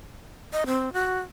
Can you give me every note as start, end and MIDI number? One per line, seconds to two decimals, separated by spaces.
0.53 0.64 75
0.66 0.93 60
0.93 1.19 66